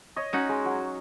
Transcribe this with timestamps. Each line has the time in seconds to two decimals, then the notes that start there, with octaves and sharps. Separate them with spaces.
0.16 C#5 D#5
0.33 C#4 D#4 F#4
0.49 G#3
0.65 F#3